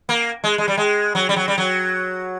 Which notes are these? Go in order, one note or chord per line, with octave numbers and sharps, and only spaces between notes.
A#3
G#3
G#3
G3
G#3
F#3
G3
F#3
G3
F#3